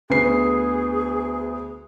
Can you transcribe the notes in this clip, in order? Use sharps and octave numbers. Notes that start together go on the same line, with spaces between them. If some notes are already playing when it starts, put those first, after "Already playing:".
D2 B3 G#4 C7